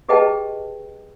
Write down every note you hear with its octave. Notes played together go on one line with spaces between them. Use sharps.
G4 G#4 B4 D#5 G5 A5